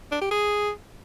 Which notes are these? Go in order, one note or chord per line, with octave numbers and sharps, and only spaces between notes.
D4
G4
G#4